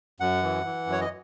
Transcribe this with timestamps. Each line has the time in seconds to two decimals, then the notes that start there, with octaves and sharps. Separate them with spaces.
0.20 F#2 F#5
0.43 E3
0.64 E3
0.87 F#2
0.92 C#5
1.01 D#5